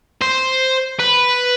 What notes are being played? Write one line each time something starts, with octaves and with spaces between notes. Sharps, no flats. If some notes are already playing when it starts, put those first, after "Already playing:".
C5
B4